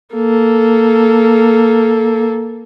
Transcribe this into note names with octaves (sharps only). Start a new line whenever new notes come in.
A#3 A4